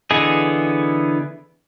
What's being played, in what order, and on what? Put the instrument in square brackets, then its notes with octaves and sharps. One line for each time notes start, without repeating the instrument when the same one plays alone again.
[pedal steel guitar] D3 E3 B3 G#4 D#5